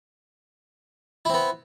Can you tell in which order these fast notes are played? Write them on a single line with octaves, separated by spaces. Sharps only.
E4 C4 B3